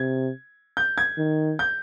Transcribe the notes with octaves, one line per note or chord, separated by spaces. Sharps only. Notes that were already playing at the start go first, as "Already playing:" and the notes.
Already playing: C3 G#6
G6
G#6
D#3
G6